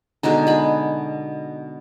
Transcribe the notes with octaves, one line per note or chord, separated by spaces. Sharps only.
B2 D3 G#3 D#4
G#4 B5